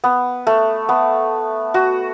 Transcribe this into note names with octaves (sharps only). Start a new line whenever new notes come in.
B3
A3
B3
F#4